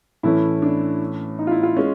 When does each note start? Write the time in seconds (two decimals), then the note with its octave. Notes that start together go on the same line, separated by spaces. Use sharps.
0.23 A2 E3 A3 C#4 E4
0.62 D4
1.39 D#4
1.47 F4
1.51 E4
1.63 F4
1.77 G#3 C#4